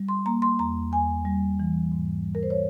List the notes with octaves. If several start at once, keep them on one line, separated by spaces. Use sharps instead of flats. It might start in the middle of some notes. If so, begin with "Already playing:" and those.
Already playing: G3
C6
A#3 A#5
C6
E2 A#5
E2 G#5
G3
E3
G#2
G3
A#4
C5
C#5